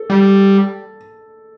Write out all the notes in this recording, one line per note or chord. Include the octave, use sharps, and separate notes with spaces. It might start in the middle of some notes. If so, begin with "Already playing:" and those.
Already playing: A4
G3